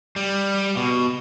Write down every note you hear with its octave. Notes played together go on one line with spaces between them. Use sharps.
G3
B2